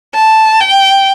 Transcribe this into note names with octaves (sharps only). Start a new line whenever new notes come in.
A5
G5